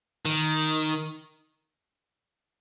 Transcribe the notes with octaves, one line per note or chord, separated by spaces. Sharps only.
D#3